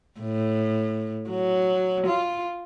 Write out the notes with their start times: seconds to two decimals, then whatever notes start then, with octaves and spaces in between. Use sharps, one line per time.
0.20 A2
1.30 F#3
2.07 F4